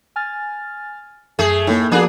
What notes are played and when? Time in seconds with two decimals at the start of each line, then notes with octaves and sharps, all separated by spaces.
0.16 G#5 F6 A6
1.39 F#2 A3 G#4
1.67 A2 A#3 D#4
1.91 F3 A#3 B3 D4 F#4 G#4